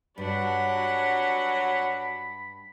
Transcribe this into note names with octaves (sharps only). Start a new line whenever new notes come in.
G2 F#3 D4 F#5 B5